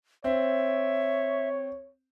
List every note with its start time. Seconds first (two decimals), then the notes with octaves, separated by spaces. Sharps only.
0.24 C4 C#5 E5